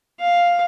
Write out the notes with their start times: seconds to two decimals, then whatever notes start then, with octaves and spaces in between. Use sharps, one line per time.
0.20 F5